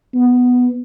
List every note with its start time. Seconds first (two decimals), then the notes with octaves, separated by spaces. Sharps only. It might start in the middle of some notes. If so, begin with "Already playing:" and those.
0.15 B3